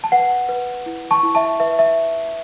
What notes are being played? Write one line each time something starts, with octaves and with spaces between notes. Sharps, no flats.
A5
B4 F#5
B4
E4
A5 C#6
E4
E5 A5
B4 E5
E5